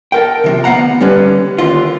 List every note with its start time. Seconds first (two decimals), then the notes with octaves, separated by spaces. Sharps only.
0.12 A4 A#4 G5
0.44 C3 D#3 F3
0.64 D2 B3 C4 F5 F#5 A#5
1.01 D3 G3 C#4 B4
1.58 D#2 D3 F4